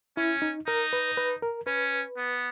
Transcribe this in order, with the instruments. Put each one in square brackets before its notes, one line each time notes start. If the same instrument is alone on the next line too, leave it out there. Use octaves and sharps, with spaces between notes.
[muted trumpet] C#4 [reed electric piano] E4
[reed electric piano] D#4
[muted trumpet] D#4 [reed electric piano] A#4
[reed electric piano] B4
B4
A#4
[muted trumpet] C#4 [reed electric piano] B4
[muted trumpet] B3